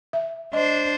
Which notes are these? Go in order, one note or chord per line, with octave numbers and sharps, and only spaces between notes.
E5
D4 C5 D#5